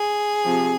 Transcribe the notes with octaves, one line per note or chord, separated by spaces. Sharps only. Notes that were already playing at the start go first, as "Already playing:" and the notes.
Already playing: G#4
C3 F3